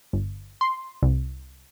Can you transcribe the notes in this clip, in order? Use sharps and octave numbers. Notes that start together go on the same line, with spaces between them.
G1
C6
C2